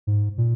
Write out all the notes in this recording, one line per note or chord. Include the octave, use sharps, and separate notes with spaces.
G#2
A#2